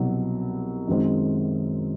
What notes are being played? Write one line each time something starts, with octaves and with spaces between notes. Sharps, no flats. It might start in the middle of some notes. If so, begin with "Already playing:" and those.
Already playing: C2 B2 F#3
F#2 D#3 G#3 C4